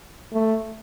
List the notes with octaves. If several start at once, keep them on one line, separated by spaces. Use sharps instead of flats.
A3